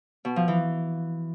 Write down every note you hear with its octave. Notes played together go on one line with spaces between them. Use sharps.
B2
F3
E3